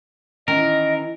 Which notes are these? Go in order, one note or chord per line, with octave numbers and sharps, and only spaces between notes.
D#3 E3 C#4 A#4 D#5